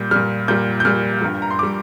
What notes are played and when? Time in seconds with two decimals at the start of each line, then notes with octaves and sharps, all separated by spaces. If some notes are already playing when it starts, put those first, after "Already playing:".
Already playing: A#2 G3 G6
0.11 A#2 G3 F6
0.48 A#2 G3 G6
0.80 G6
0.85 A#2 G3 F6
1.22 G2 G3
1.42 A#5
1.50 C6
1.59 G3 D6